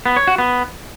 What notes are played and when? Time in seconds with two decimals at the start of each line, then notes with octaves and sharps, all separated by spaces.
0.06 B3
0.17 C#5
0.27 F#4
0.38 B3